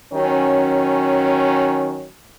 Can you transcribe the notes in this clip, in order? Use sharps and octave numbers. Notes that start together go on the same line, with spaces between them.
D#3 F#3 C#4